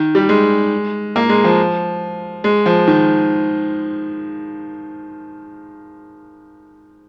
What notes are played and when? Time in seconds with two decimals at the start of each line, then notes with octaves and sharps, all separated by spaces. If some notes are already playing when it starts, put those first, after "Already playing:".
Already playing: D#3
0.15 G3
0.29 G#3
1.16 A#3
1.29 G#3
1.44 F3
2.44 G#3
2.66 F3
2.87 D#3